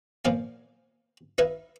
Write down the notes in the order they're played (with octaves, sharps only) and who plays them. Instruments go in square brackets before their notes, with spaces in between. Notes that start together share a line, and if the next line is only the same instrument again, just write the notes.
[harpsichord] A#2 F3 F5 G#5
D#4 B4 E5 F5